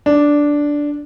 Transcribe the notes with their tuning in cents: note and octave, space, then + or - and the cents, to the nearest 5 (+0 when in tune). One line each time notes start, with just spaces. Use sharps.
D4 -5